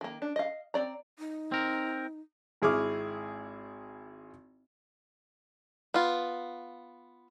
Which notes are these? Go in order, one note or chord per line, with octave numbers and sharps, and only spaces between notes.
D#3 A#3
D4
D#5 F5
C4 D5 A#5
D#4
C4 A#4
G#1 E4 G#4 C#6 D6 F6
B3 F4